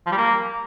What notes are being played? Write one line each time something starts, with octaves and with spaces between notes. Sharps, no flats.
F3
G3
A#3